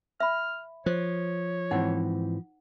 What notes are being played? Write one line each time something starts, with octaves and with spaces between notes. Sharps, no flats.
E5 B5 F6
F3 C5 C#5
G#2 E3 C4 D#4 F#5